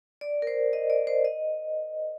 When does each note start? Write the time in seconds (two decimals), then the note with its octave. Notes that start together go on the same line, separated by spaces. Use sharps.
0.21 D5
0.42 A#4
0.47 C5
0.73 D#5
0.90 D5
1.07 C5
1.25 D#5